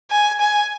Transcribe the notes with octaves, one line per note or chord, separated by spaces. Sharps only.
G#5
G#5